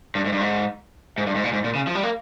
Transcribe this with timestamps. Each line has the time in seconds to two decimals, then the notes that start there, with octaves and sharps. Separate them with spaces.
0.15 G2
0.25 G#2
0.32 G2
0.41 G#2
1.18 G#2
1.27 G2
1.35 G#2
1.44 A#2
1.53 G#2
1.64 A#2
1.75 C#3
1.87 F3
1.95 G3
2.03 A#3